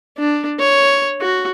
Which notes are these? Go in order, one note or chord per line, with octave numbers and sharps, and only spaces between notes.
D4
C#5
F#4